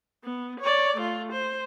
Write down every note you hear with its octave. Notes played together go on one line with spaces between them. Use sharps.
B3
C#5 D5
A3 F4
C5